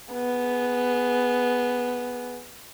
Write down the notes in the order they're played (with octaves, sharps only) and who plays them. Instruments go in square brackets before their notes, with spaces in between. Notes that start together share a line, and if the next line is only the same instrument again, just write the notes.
[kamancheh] B3 G#4